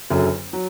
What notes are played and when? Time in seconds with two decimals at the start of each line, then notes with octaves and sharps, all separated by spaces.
0.10 F#1 F#2 D3 F#3
0.53 F#3